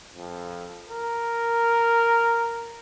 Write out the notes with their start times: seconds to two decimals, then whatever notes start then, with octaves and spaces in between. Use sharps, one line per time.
0.15 F2
0.90 A#4